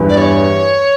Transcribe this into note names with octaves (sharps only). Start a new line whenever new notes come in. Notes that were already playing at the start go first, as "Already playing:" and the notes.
Already playing: E2 G2
D5
C#5